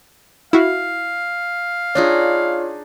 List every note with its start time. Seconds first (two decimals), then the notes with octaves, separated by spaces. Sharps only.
0.53 E4 F#4 F5
1.95 D4 D#4 F4 G#4 C#5